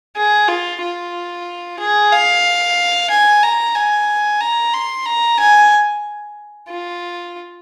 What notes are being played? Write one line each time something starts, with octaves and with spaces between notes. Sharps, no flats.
G#4
F4
F4
G#4
F5
G#5
A#5
G#5
A#5
C6
A#5
G#5
F4